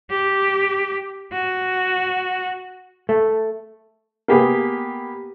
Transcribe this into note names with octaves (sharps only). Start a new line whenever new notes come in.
G4
F#4
A3
A#3 B3 G4 G#4 B4